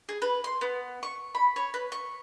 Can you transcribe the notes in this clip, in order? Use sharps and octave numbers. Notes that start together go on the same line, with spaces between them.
G#4
B4
C6
B3
C#6
B5
C#5
B4
C#6